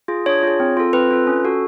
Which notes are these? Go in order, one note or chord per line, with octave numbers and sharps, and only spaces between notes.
F4 G#4
D4 C#5
F4 G#4
C4
F4 A4
C4 B4
F4 A4
C#4
F#4 A4